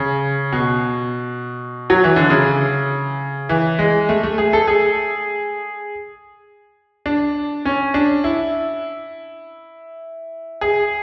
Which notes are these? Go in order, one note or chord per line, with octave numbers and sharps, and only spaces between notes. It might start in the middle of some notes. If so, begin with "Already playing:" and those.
Already playing: C#3
B2
F#3
E3
D3
C#3
E3
G#3
A3
A3
G#4
A4
G#4
D4
C#4
D4
E4
G#4